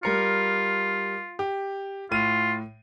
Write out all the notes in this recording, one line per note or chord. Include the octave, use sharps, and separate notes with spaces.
G3 F4 A#4 C#7
G4
A2 F4 D#7